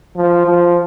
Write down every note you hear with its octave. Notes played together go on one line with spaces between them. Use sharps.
F3
F3